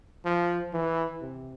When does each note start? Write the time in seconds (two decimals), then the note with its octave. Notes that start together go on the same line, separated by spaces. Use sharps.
0.25 F3
0.73 E3
1.21 C3